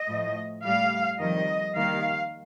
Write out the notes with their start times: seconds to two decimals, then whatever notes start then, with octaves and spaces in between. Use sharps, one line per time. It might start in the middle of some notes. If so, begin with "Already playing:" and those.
Already playing: D#5
0.09 A2 F3
0.64 A2 G3 F5
1.19 F2 D#3 G3 D#5
1.75 D#2 D#3 G3 F5